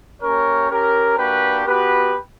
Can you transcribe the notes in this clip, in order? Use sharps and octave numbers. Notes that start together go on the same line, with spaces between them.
A#3 C#4 G4 A#4 C#5
C#4 G4 A#4
A#3 D4 F#4 G4 B4
B3 F#4 G4 B4